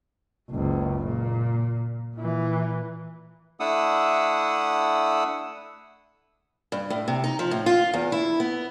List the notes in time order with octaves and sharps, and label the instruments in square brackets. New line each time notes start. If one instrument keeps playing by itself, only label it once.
[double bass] F#1 C#2
A#2
A#2 E3
[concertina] A3 D4 E4 F#5 D#6 E6
[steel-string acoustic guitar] G2
A2
C3
D#4
F3
A2
F4
E2
E4
B3